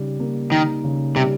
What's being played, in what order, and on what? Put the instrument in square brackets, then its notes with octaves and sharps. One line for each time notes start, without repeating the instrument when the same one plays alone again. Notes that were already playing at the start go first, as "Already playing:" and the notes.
Already playing: [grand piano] C#3 G3 D#4
A#3
[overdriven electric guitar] D#3 [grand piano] D#4
[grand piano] C#3
[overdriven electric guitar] C3 [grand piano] G3